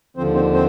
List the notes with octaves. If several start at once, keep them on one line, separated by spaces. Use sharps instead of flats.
D#2 D3 F3 C4 C5
C4 C5
C4 C5